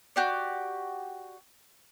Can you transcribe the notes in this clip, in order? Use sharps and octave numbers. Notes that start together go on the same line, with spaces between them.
F#4 G4 D5